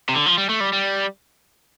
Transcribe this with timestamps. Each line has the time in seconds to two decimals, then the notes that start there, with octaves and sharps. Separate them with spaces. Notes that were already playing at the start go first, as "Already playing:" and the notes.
0.09 C3
0.15 D3
0.26 F3
0.38 G3
0.49 A3
0.60 G3
0.73 G3